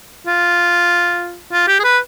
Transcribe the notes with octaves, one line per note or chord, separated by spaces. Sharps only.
F4
F4
G4
G#4
B4